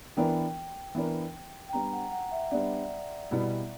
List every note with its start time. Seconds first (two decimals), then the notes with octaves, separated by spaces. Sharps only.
0.17 E3 B3 D4 A#4 G5
0.95 E3 B3 D4 A#4
1.69 G5
1.73 G3 B3 D4 A#5
1.93 F#5
2.12 F#5
2.32 E5
2.51 G3 B3 D4 D5
3.31 B2 G3 B3 E4